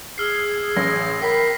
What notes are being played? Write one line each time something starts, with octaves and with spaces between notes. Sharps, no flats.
G#4 E6 F6 C7
A1 A#6
A#4 G5 B5 B6 C7